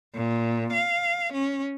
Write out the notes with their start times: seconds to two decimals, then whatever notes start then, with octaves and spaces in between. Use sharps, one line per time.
0.15 A#2
0.73 F5
1.33 C#4